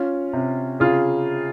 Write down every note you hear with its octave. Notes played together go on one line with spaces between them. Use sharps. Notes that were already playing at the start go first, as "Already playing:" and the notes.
Already playing: C#4 F4
C3
C#3 F4 G#4